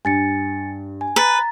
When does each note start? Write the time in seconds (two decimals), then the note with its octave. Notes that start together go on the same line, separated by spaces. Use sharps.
0.05 G2 G#5 A6 C#7
1.01 G#5
1.16 B4 A#5 A6